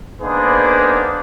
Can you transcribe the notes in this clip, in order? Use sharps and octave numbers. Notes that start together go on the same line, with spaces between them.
A#3 B3 D4 D#4 G#4 C5